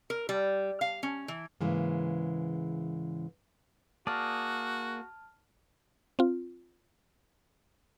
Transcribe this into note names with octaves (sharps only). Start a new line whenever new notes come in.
A#4
G3
F5
C#4
E3
G#2 C#3 E3 G#3 A#3
A#3 F#4 G#4 D5 A5 F6
C4 F4